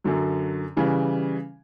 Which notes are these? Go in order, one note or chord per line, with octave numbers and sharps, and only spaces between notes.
F#2 D3 F#3
C#3 E3 G3